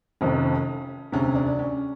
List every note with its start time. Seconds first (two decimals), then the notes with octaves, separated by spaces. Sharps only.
0.21 F1 F2 C3 D#3 C#4
1.12 E1 D2 C3 C#4
1.35 D4
1.59 C#4